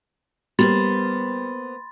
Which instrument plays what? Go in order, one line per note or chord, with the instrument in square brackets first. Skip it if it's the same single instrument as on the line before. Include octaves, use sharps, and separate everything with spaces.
[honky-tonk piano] G3 [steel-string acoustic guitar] A#3 B3 C5 [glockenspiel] B5 C6 A6